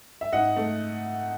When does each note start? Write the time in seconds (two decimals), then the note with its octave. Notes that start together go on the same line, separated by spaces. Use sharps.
0.21 E5
0.32 G#2 D#5 F#5
0.56 A3